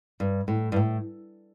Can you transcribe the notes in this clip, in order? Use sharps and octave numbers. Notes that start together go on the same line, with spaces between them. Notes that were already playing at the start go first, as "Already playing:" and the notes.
G2
A2
G2
A2